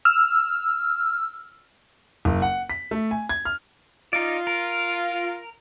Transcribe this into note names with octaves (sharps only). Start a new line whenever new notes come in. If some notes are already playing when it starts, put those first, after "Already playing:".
E6 F6
F#1
F#5
B6
A3
G#5
G#6
F6
D#4 F4 D5
A#4